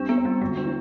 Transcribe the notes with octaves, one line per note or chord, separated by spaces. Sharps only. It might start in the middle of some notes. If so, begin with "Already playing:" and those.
Already playing: G3 C4 D4
B3
C4
G3
D2 G#3
D4
E3